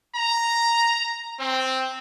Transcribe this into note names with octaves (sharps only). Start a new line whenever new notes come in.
A#5
C4